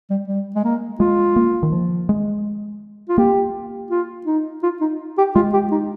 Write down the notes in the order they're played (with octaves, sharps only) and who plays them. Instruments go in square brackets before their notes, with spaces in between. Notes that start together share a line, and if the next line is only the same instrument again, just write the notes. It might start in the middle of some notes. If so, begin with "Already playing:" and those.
[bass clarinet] G3
G3
G#3
A#3
[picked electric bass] G#3 [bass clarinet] F4
[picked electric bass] A#3
D#3
F3
G#3
[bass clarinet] F4
[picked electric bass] A#3 [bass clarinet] G4
[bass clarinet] F4
D#4
F4
D#4
G4
[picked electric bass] G#3 [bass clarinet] F4
[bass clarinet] G4
D#4